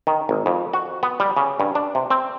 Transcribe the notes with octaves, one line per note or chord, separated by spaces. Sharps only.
D#3
G#1
F2
F#4
B3
G3
C#3
G2
D4
C3
C4